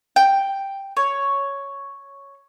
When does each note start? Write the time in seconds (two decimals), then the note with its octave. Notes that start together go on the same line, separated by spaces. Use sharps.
0.16 G5
0.97 C#5